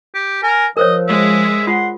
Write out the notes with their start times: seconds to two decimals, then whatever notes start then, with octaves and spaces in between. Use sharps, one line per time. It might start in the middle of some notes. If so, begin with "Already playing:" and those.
0.14 G4
0.43 A#4 G#5
0.77 F3 A#4 C5 C#5 D#5
1.08 G#3 E5
1.67 F4 F#5 C6